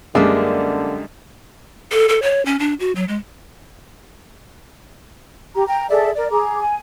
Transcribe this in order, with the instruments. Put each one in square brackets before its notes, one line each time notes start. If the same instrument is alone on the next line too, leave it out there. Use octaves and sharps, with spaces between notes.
[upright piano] F#2 G3 [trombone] D3 [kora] G#3 D4 E5 [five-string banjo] A#3
[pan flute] A4
A4
C#5
C#4
D4
F#4
F#3
G#3
[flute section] G4 A#5
G5 A#5
G#4 A4 D5 E5
A#4 D5
G#4 A#5 D6
G#5